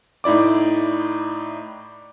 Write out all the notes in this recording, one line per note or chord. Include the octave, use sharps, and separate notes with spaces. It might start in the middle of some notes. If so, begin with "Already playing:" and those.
A2 D#4 E4 D5 D6